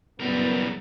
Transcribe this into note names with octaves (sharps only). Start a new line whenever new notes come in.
F#1 E3 G3 B3 A#4